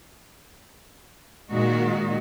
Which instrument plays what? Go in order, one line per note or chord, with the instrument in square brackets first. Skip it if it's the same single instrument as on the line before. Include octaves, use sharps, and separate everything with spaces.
[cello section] A#2 D#3 G#3 D#4 F#4